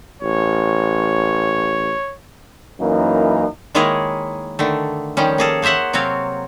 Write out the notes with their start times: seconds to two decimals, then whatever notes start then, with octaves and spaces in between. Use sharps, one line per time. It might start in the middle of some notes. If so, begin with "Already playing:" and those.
0.22 A1 C#5
2.80 F#2 E3 A#3 C#4 D#4 E4
3.75 D#3 G#3 A#3 E4 G#4 C#5
4.59 D3 D#3 A3
5.17 D#3 F3 G3 C#4
5.38 A#3 G#4 A4
5.62 A#3 C5 C#5 E5 F#5
5.93 C3 F#3 C4 C#5 F5